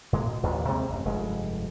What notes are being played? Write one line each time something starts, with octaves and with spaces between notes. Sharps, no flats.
A2 G#3 A#3
B2
A1 D#2 A#2
C3 G#3 A#3 C4
A1 F#2 C3
F1 G2 G#3